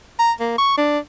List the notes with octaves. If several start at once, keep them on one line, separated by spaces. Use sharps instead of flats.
A#5
A#3
C#6
D4